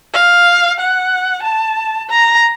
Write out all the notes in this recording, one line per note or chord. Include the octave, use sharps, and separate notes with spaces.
F5
F#5
A5
A#5